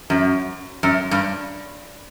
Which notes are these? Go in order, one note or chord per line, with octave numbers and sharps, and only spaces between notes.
F#2
F#2
G2